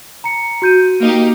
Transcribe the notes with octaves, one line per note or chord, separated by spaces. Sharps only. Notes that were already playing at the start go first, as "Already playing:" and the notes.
A#5 C#7
F#4 G6 D#7
A#3 D#4 G4